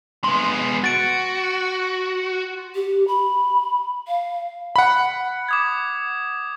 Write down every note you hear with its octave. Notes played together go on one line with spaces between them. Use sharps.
G#3 B3 C6
F#4 A6 D7
G4
B5
F5
F#5 B5
D6 D#6 G#6